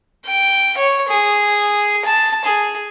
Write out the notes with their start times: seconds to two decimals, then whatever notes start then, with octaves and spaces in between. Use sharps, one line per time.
0.27 G5
0.77 C#5
1.08 G#4
2.05 A5
2.45 G#4